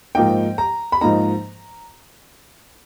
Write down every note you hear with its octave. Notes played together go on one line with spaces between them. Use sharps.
G#2 F3 A#3 D#4 G5
A#5
B5
G#2 F3 A#3 D#4 A#5